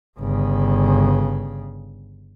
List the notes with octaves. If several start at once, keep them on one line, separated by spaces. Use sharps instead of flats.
G1 C#3